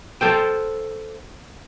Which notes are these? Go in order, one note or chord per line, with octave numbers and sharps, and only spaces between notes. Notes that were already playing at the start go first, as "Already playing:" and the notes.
A4 C5 G5